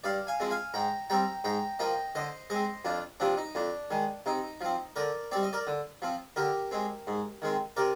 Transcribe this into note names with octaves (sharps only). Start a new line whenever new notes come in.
G2 D5 F5
F5 G#5
F3 G#3 C4
F5 G#5
G#2 G5 A#5
G3 C4 G5 A#5
G#2 G5 A#5
F3 A#3 D#5 G5
D3 C5 D#5
G#3 C4 C5 D#5
F2 D4 F4
C3 F3 C4 D4
D#4
F2 D4
D#3 G#3
C3 D#4
F3 C4
D3 A#4 D5
G3 C4 D5
D#5
A#4 D5
D3
F3 C4
D3 G4 A#4
G#3 C4
G#2
D#3 G#3 C4
C3 A#4 D5